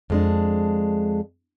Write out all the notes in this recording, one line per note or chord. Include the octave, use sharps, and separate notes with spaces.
F2 G#3 D4